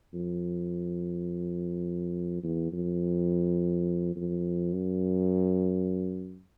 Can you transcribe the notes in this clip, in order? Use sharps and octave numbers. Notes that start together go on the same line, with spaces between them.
F2
E2
F2
F2
F#2